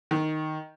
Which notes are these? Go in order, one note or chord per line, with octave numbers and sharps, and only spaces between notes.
D#3